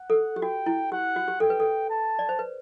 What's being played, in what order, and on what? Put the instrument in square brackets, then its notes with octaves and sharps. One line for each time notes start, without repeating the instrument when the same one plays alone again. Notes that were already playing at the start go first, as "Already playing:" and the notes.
Already playing: [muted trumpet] F#5
[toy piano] A4
G4
[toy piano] F#4 [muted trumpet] G5
[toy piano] E4
[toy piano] G4 [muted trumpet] F#5
[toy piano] F#4
G4
[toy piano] A4 [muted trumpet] G5
[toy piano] B4
A4
[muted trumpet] A5
[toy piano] D5
C5
B4